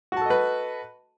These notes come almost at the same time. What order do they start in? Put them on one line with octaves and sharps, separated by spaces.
F#4 A5 A4 D#5 B4